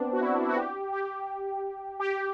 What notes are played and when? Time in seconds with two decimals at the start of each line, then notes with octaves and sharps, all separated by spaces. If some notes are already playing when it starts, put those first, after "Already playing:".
Already playing: B3 C4 D4
0.13 F#4
0.21 E4
0.34 D4
0.41 E4
0.48 F#4
0.57 G4
0.92 G4
2.00 G4